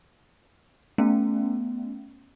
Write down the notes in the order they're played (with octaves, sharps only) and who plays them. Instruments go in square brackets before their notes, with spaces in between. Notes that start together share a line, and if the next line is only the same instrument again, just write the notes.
[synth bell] A3 B3 C#4